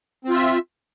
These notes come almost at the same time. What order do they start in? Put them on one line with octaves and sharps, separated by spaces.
C4 F4 E5